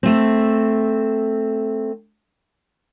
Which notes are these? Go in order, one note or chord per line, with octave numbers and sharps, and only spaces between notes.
A3 C4